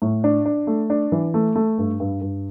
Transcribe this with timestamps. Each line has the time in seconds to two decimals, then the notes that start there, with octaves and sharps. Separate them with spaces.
0.02 A2
0.24 D4
0.46 D4
0.67 A3
0.90 D4
1.12 E3
1.34 A3
1.56 A3
1.78 G2
2.00 G2
2.21 G2